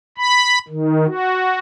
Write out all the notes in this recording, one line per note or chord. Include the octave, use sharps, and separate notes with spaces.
B5
D#3
F#4